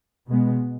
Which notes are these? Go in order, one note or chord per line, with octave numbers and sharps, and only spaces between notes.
B2 G#3 B3